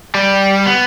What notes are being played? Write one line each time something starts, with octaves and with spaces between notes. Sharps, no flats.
G3
B3